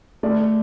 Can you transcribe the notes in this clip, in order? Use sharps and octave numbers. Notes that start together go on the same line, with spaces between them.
A3 D5